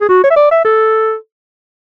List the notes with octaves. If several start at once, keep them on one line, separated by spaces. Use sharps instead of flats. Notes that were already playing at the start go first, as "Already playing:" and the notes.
G#4
F#4
C#5
E5
D5
E5
A4